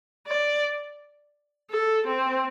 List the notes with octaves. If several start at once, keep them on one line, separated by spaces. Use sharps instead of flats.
D5
A4
C4